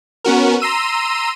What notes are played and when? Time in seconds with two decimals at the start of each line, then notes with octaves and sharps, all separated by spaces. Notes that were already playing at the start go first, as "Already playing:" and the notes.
0.24 B3 C#4 F#4 A#4
0.60 A#5 C6 E6 D#7